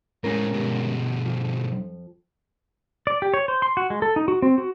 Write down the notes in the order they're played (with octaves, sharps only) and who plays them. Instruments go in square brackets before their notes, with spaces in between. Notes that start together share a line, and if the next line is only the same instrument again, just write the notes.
[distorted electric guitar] A2 G#4 [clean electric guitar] G#3 C#4 A#4
[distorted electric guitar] G2 B2
[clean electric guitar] F2 F3
[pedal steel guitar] D5
G4
C#5
C5
C6
F#4
G#3
A4
D#4
F#4
C4
F#4